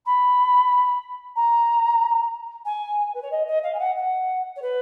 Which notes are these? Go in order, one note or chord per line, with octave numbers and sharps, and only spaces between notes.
B5
A#5
G#5
B4
C#5
D#5
D#5
F5
G#5
F#5
F#5
C#5
B4